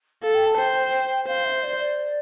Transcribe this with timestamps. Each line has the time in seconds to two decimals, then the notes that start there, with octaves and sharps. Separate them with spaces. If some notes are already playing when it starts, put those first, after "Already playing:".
0.23 A4 F5
0.34 G5
0.46 A5
0.58 C5 G5
1.27 C5 F5
1.45 E5
1.63 D5
1.80 D5